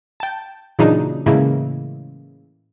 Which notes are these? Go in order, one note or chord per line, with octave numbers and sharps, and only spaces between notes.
G5 A5
A#2 C#3 E3 F#3 D4 D#4
A2 C#3 E3 G#3 A#3